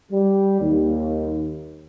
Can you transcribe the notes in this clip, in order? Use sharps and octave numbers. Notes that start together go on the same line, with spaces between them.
G3
D#2